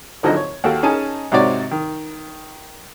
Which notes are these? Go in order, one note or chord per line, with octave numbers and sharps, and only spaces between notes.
G#1 D3 F3 F#3 D#4 D#5
C#5
D#2 F#4 A4 G5
C#4 D#4 G#4 G#5 A5
G#2 C3 D#4 F#4 C#5 D5
D#3